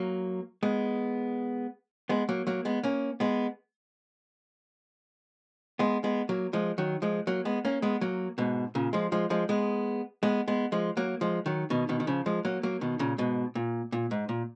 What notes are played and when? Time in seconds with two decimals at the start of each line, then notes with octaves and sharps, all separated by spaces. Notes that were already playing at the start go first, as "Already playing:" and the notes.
Already playing: F#3 A#3
0.63 G#3 B3
2.09 G#3 B3
2.29 F#3 A#3
2.47 F#3 A#3
2.65 G#3 B3
2.83 A#3 C#4
3.20 G#3 B3
5.79 G#3 B3
6.04 G#3 B3
6.29 F#3 A#3
6.53 F3 G#3
6.78 D#3 F#3
7.02 F3 G#3
7.27 F#3 A#3
7.45 G#3 B3
7.65 A#3 C#4
7.82 G#3 B3
8.01 F#3 A#3
8.38 G#2 B2
8.75 A#2 C#3
8.93 F3 G#3
9.12 F3 G#3
9.30 F3 G#3
9.49 G#3 B3
10.23 G#3 B3
10.48 G#3 B3
10.72 F3 G#3
10.97 F#3 A#3
11.21 F3 G#3
11.46 D#3 F#3
11.70 B2 D#3
11.89 B2 D#3
12.00 D#3
12.07 C#3 F3
12.26 F3 G#3
12.45 F#3 A#3
12.63 F#3 A#3
12.81 B2 D#3
12.99 A#2 C#3
13.18 G#2 B2
13.55 A#2
13.92 A#2
14.11 G#2
14.29 A#2